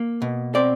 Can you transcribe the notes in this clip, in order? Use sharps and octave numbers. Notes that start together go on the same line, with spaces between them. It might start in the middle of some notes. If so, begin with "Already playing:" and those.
Already playing: A#3
B2
C4 D5